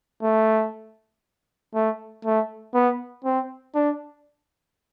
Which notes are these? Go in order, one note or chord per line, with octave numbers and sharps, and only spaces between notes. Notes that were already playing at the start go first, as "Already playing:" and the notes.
A3
A3
A3
B3
C4
D4